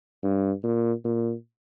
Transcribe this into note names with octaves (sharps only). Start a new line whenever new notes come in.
G2
A#2
A#2